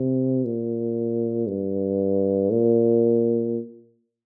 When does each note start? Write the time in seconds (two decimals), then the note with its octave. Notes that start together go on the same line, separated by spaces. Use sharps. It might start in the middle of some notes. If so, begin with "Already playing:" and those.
Already playing: C3
0.45 A#2
1.47 G2
2.51 A#2